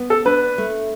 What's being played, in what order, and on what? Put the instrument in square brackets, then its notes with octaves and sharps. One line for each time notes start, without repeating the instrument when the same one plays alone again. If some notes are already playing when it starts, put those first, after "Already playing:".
Already playing: [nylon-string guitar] B3
[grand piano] A4
[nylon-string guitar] D4 [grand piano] B4
[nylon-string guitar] A3